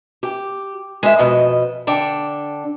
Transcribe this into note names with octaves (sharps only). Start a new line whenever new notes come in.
G4
G#3 E5
F2 B2 D#5
D3 D4 G5